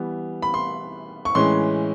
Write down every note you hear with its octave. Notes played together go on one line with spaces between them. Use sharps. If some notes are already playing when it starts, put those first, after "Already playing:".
Already playing: E3 G3 B3
B5
C6
C#6
A2 E3 G#3 C#4 C6